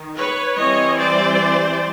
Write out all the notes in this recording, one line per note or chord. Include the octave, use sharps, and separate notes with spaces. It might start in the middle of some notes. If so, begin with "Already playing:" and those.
Already playing: D#3
B4 C#5
E3 G3 C4 C#5 D#5
C5 D5